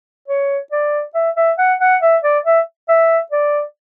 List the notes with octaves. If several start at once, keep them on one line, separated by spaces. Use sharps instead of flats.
C#5
D5
E5
E5
F#5
F#5
E5
D5
E5
E5
D5